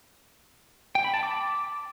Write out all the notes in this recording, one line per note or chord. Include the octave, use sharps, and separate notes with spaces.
G5
B5
A5
D6